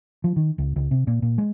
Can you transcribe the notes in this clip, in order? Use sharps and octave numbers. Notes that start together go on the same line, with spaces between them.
F3
D#3
C#2
C#2
C3
A#2
A#2
G#3